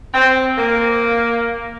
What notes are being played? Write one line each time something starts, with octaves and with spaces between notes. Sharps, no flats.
C4
A#3